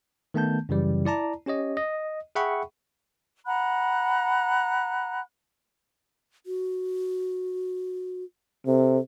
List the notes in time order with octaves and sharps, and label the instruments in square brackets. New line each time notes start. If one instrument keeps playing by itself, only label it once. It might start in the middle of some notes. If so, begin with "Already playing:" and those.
[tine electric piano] D#3 A3 B3 A5 G6
F#2 C#3 E3 G3
E4 D5 A5 A#5
C#4 G4 C#5 D#5
D#5
G#4 E5 F#5 G5 B5 C#6
[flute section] F#5 A#5 B5 F#6
[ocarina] F#4
[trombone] C3 [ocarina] A4